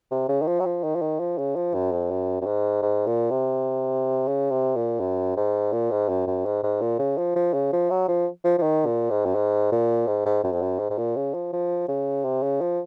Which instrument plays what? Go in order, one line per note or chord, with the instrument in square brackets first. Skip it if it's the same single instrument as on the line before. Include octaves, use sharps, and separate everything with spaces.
[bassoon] C3
C#3
D#3
F3
F#3
F3
D#3
F3
D#3
F3
C#3
F3
F#2
F2
F#2
F#2
G#2
G#2
A#2
C3
C#3
C3
A#2
F#2
G#2
A#2
G#2
F#2
F#2
G#2
G#2
A#2
C#3
F3
F3
C#3
F3
F#3
F3
F3
F3
D#3
A#2
G#2
F#2
G#2
A#2
G#2
G#2
F#2
F2
F#2
G#2
G#2
A#2
C#3
F3
F3
C#3
C3
C#3
F3